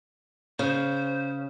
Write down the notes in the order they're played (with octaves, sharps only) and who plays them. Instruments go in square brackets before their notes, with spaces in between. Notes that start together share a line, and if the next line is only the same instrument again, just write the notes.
[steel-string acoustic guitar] C#3 [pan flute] C5